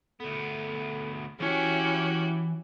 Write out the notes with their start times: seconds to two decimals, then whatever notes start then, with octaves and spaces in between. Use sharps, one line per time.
0.20 D2 B3 A4
1.40 E3 C#4 E4 F#4 G4 G#5